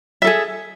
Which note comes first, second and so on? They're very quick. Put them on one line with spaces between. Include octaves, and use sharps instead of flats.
E5 A4 G#4